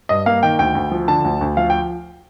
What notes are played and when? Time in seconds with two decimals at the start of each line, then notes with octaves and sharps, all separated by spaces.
0.09 G2 D#5
0.26 A#3 F5
0.43 D#3 G5
0.59 D2 G5
0.75 D2
0.91 F3
1.08 D3 A5
1.25 D2
1.41 D2
1.57 F3 F5
1.70 G5